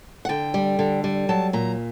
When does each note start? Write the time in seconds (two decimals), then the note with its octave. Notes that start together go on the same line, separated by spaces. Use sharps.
0.25 F#5
0.29 D3 G5
0.54 G3
0.79 D3
1.04 G3
1.29 F#3 A5
1.53 A#2 A#5